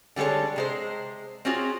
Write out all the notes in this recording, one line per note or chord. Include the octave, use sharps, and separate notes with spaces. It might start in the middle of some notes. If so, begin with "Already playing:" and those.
D3 G3 G#3 A4 C#5
C3 G#3 C5
C4 C#4 F4 F#4 G#4